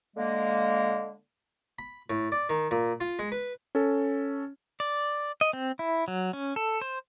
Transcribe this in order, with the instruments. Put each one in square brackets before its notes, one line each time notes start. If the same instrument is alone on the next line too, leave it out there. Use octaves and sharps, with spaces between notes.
[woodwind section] D3 G#3 A#3
[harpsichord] B5
A2
D5
D#3
A#2
F4
G#3
B4
[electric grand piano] C#4 A4
[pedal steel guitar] D5
D#5
C4
E4
F#3
C#4
A4
C5